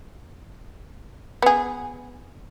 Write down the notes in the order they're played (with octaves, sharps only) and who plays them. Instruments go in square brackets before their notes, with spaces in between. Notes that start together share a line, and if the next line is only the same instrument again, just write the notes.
[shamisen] B3 G#4